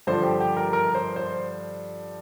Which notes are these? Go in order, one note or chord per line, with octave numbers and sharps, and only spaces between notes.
G2 D3 F3 C5
G4
G4
A#4
A#4
C5
C5